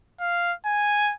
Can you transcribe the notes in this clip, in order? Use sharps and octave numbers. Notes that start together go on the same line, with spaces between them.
F5
G#5